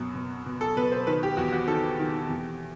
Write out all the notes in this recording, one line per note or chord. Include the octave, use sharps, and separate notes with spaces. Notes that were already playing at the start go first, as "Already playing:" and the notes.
Already playing: F#2 B2
B2
B2
A4
B2 B4
C5
D#3 B4
G4
E2 F#4
F#4
D#3 A4
D#3
E2